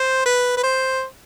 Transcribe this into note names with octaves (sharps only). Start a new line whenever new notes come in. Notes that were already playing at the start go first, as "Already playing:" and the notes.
Already playing: C5
B4
B4
C5